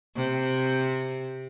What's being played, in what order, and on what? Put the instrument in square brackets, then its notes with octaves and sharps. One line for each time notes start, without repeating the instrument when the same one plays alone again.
[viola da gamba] C3